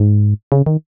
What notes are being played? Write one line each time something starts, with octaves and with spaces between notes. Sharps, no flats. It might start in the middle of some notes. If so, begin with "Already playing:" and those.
Already playing: G#2
C#3
D#3